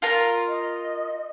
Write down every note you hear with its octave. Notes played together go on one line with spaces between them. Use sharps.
F4 A#4 A#5
D#5